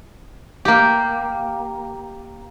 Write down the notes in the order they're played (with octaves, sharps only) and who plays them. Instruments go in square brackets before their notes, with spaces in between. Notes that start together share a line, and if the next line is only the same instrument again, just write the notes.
[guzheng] A#3 G4